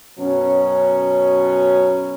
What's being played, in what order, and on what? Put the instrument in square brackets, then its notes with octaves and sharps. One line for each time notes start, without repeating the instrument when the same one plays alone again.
[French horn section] F#2 B2 F#3 C#4